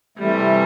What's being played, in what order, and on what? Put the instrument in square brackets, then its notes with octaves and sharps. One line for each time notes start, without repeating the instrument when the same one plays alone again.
[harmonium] C3 E3 A3 [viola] G3